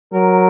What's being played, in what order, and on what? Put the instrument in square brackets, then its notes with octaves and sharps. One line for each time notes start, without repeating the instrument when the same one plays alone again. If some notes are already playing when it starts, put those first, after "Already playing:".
[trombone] F#3 [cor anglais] A#4